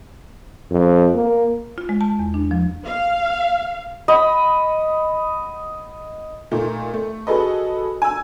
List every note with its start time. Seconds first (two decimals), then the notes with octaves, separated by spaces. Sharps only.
0.71 F2
1.14 A#3
1.78 F4
1.89 G#3
2.01 A5
2.19 E2
2.34 D4
2.51 F3
2.85 F5
4.08 D#5 F#5 B5
6.51 A#2 A3 D#4
6.94 A3
7.27 F#4 G#4 A4 B4 D#5
8.02 G#5 E6